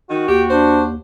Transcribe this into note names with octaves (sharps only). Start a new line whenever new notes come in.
D#3 F#4
D#2 G4
D4 C5